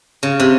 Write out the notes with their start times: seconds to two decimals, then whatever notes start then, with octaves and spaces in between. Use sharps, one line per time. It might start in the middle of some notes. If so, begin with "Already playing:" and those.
0.23 C#3
0.40 C3